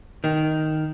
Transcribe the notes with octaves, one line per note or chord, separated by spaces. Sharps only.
D#3